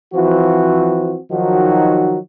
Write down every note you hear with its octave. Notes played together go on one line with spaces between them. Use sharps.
E3 F3 C4 F#4
D#3 F3 F#3 D#4 F#4